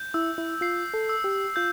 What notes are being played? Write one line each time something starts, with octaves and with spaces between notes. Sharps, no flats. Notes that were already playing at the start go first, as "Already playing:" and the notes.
Already playing: G6
E4 E6
E4
F4 C7
A4
E6
G4
F4 G6